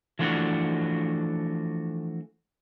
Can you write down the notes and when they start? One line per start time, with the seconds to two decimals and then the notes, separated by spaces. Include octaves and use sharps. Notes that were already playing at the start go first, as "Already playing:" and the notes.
0.19 E3 F3 A3 D4 F#4